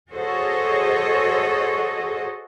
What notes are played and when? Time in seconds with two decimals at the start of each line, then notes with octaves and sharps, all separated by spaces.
0.11 F#4 G#4 A4 C5 C#5 D#5